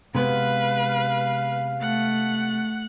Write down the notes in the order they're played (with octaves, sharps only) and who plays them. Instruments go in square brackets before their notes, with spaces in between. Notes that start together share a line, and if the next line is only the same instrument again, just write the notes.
[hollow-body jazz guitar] C3 G#3 B3 [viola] B4 [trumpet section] F5
[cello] A3 [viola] F#5